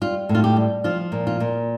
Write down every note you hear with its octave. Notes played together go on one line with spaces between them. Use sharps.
G3 F4
A2
F4
G4
G3
F3 F4
A#2
F4
A#2